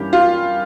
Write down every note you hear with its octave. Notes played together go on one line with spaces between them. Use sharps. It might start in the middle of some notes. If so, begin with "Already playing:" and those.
Already playing: G2 E3 A#3 C#4 G4
F4 F5